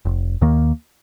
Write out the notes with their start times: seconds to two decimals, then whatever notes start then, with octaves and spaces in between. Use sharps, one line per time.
0.05 F1
0.41 D#2 D#3 A#3